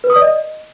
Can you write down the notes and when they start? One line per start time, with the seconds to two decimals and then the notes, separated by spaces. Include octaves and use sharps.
0.04 B4
0.10 D#6
0.16 D5
0.22 D#5